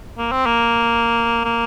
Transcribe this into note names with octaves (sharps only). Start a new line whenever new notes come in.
A#3
C4
A#3
A#3